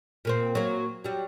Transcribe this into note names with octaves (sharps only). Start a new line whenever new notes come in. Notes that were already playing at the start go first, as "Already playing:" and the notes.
A#2 A#3 C4
F#3 A#3
F#3 G3